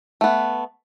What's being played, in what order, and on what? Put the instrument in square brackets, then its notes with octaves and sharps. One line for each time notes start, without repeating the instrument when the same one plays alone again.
[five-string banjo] A3 B3